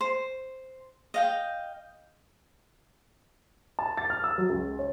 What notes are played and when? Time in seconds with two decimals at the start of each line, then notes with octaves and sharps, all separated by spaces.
0.01 C5
1.14 D#5 F5 G5
3.79 A5
3.97 A6
4.10 F6
4.24 E6
4.38 F#3
4.50 C#2
4.79 C#5